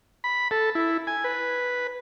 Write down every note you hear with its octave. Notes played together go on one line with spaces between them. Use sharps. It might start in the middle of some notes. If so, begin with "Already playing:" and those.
B5
A4
E4
G#5
B4